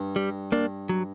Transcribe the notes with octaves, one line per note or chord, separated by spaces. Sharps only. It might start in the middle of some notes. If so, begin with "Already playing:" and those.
Already playing: G2
G3
A#3 D4
F#3